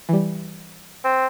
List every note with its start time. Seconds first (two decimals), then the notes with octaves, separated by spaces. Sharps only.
0.09 E3 G3
1.04 C4